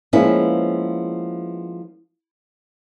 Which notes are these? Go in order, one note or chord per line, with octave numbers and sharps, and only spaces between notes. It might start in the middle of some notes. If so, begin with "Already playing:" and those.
F3 G#3 A#3 B3 C#4 E4